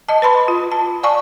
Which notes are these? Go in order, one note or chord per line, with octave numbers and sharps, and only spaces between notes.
D#5 A5
B4 A5 B5 C6
F4
A5
D5 F5 G#5 A5 C#6